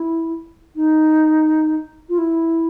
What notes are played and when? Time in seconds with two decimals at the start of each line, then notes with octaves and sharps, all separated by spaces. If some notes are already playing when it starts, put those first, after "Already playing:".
Already playing: E4
0.75 D#4
2.09 F4
2.18 E4